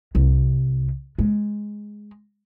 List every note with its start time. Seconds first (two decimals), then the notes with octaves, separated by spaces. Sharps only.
0.15 C2
1.19 G#3